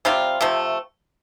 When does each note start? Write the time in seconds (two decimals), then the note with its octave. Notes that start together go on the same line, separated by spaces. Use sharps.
0.05 C3 G3 C4 F4
0.41 C3 F3 A3